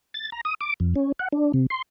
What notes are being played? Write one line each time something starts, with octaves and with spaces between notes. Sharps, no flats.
A6
A#5
D#6
D6
F2
C#4
F#5
D4
C3
C6